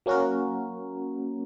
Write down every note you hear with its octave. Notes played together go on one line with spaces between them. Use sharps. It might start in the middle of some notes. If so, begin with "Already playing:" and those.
F#3 A#3 C#4 F#4 A#4